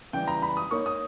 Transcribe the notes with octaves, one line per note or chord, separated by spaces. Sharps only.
C#3 E3 G3 G5
A#5
B5
D#6
A#3 D#4 A#4 C#5 C#6
D#6